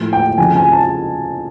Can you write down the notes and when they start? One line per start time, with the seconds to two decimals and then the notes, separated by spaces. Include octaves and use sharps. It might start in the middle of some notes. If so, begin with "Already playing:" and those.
Already playing: A2 F3 A#3
0.13 G5
0.38 F2 C#3 F3 G#5
0.55 G#5
0.72 A5